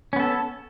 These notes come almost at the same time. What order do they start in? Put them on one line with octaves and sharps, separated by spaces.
C#4 B3 A4